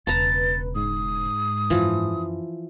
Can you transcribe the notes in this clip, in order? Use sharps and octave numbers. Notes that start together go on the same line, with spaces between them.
E1 C#3 B4 A5 A#5 A6
G#2 D#6
F#2 E3 F3